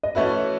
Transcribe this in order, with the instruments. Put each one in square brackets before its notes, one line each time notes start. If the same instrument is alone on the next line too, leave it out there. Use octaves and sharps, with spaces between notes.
[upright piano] D#5
[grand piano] E3 A3 C#4 F#4 B4 [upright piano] E5